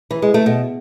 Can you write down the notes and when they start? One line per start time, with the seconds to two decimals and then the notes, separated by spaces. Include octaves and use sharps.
0.11 E3
0.22 G#3
0.34 A3
0.46 B2